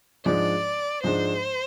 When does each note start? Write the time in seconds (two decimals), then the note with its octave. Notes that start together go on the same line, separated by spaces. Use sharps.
0.25 G#2 F3 G#3 D4 D5
1.03 G#2 F3 G#3 D4 C5